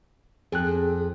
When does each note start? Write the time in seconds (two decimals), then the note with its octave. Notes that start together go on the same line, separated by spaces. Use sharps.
0.52 F2 G#4 F#6